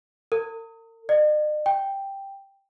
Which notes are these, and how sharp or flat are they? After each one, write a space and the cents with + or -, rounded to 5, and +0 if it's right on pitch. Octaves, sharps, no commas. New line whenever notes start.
A#4 -40
D#5 -45
G5 +0